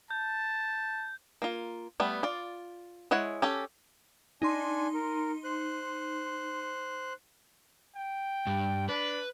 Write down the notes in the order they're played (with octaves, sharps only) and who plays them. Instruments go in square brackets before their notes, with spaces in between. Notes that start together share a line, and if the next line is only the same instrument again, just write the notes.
[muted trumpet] A5 [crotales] G6
[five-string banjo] A#3 F4
G3 A3 B3
F4 D5
G#3 E4 C#5 F#5
C#4 G4 A4
[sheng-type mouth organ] D4 G#5 [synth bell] D#4 C6
[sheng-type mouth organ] A#4
C5 F#6
[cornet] G5
[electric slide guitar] G2
[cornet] D4 [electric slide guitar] B4